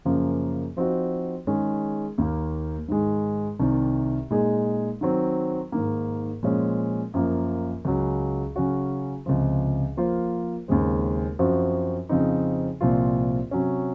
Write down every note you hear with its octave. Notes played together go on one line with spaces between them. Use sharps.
F#2 C#3 F3 A#3
F3 C4 D#4 F#4
D#3 G#3 C#4 G#4
D#2 D#3 A#3
G#2 D#3 G#3
C2 C3 D#3
A#2 G#3 D#4 G#4
D#3 F#3 C4
G#2 D#3 A#3
A#2 F3 G#3 C#4
F#2 F3 A#3 F4
C#2 C#3 F#3
C#3 F#3 C#4 F#4
C#2 C3 F3
F3 A#3 F4 C5
D#2 C#3 G#3 C4
F#2 F3 C4 F#4 C5
F2 C#3 F3 C4 D#4
C2 A#2 F3 C4 F4
C3 F#3 C#4